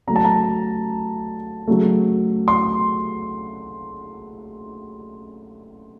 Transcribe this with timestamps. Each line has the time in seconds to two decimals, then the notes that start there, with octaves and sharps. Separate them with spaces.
0.07 C#3 F#3 A3 A#5
0.16 A5
0.25 A#5
1.67 C#3 F#3 A3
2.48 C6